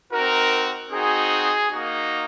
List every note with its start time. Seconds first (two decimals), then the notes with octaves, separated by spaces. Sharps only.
0.11 C4 D#4 F#4 A#4
0.90 C4 D#4 F#4 G#4
1.70 A#3 D#4 F#4